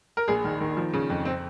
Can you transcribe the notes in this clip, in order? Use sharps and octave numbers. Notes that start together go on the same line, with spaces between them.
A#4
A#1 G#4
D#3
D#3
F3
C#3
F2
C4